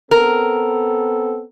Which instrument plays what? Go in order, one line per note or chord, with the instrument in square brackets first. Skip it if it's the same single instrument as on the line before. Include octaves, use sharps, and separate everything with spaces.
[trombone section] B3 C4 A4 [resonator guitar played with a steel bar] A#4